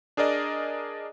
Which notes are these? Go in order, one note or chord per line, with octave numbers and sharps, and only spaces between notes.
D4 G#4 A#4 D5 D#5